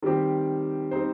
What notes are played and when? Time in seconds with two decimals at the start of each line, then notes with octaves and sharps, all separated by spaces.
0.02 D#3 G3 C4 G4
0.91 G3 C4 D#4 C5